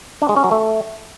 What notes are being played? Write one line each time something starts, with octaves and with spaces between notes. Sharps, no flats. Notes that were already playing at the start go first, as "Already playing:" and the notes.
D4
G#3
C#4
F#3
A3